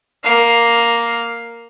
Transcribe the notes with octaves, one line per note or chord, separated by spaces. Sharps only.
A#3 F5